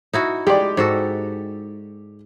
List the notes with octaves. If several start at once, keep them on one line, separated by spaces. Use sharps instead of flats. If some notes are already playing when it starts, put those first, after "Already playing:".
D#4 E4 F#4
G#3 G4 D5
G#2 F#4 A4